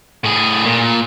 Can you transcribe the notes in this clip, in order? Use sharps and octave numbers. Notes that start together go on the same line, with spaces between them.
A2 G#4
A#2